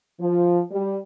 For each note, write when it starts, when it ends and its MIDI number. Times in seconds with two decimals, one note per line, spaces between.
0.19 0.59 53
0.70 0.97 55